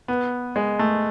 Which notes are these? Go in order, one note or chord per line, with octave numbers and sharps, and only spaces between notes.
B3
G#3
A3